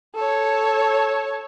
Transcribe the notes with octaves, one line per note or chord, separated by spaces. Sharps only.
A4 C#5